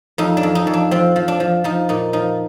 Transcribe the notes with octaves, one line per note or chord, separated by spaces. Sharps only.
F2 D#4
D4
F2
D#4
F2
D4
F3 C4
F3
D4
F3
F3 D#4
A#2 D#4
F3 D#4